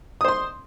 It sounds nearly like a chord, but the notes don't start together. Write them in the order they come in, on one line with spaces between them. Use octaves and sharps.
D#6 C5 C6